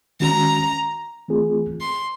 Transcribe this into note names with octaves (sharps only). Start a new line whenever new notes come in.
D#3 G#3 C#4 F#4 A#5
E3 A3 C4 F4 G#4
C6